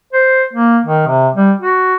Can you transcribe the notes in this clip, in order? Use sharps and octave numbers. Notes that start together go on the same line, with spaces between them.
C5
A#3
D#3
C3
G3
F#4